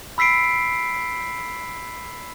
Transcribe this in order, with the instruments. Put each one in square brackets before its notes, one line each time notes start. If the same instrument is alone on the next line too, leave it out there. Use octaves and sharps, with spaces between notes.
[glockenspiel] B5 E6 B6 C7 D7